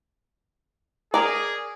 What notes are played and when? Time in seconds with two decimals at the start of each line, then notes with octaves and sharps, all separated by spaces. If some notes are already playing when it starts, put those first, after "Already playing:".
1.14 G#4 A#4 D5